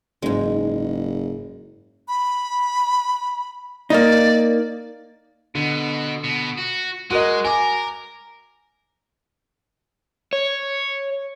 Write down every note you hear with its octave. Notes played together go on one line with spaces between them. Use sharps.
F#1 G#2 G#3
B5
A#3 D#4 D5
B2 D3
B2
F#4
G#3 F#4 A#4 D#5
A#4 G#5 D6
C#5